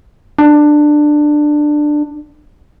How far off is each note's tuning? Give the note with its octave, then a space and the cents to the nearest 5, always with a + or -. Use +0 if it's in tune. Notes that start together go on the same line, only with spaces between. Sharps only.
D4 +15